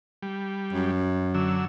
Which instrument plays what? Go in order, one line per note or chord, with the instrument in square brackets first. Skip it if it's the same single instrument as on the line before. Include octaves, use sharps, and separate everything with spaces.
[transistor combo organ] G3
[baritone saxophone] F#2
[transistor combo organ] D3 F#3 E6